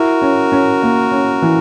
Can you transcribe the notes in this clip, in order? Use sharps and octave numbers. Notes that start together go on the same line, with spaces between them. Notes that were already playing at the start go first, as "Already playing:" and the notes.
Already playing: E4 F#4 A#4
C#4
C#4
A#3
C#4
E3